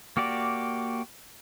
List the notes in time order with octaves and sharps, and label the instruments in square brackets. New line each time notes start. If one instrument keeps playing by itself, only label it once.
[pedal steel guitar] A#3 F#4 G4 D5